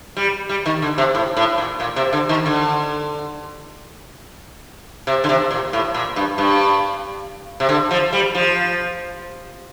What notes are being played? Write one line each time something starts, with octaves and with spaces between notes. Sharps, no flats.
G3
G3
D#3
D3
C3
A2
A2
A#2
A#2
C3
D3
D#3
D3
C3
D3
C3
A#2
A2
A#2
G2
G2
C3
D3
F3
G3
F3